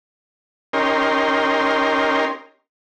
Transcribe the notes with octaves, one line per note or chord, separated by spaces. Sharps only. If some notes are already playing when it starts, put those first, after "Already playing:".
C#4 D#4 G4 A#4 C6